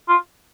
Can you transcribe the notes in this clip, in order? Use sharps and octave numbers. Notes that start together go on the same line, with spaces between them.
F4